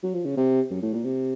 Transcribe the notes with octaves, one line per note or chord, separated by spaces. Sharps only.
F#3
F3
C#3
C3
F#2
A2
A#2
C3